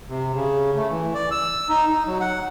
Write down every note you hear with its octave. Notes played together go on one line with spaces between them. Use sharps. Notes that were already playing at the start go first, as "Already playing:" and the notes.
C3
C#3
A3
E3
D5
E6
D#4
D#4
F#3
F#5